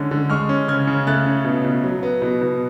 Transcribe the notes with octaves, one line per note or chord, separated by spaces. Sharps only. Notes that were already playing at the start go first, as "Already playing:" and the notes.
Already playing: D3 G#3 C#4
D3
G#3 C#6 F6
C#4
C#3 F6 G#6
C#3
A3 F#6 A6
C#4
B2
B2
F#3
B3
B2
B2